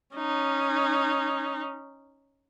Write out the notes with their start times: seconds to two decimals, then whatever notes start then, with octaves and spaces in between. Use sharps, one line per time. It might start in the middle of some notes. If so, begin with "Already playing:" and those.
0.16 C#4 D#4